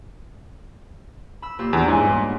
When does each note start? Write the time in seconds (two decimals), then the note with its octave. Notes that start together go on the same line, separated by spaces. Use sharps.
1.42 B5 E6
1.59 A#2 G4 E6
1.73 E2 D4
1.88 G#2 C#5 G#5
2.03 G2 B3 D#4